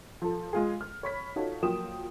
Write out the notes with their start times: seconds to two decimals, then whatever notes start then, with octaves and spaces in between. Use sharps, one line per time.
0.22 F3 A4
0.53 G#3 F4 G#4
0.81 F6
1.03 C#5 B5 B6
1.36 D#4 F4 F#4 A4 C#5
1.63 F3 F#3 A#3 G5 D#6 E7